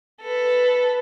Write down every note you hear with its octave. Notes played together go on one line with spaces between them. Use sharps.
A4 B4